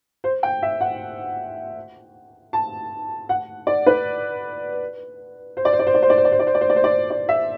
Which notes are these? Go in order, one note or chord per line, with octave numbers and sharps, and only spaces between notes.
C5
G5
E5
F#5
A5
F#5
D5
B4
C5
D5
C5
D5
C5
D5
C5
D5
C5
D5
C5
D5
C5
D5
C5
D5
C5
D5
C5
D5
E5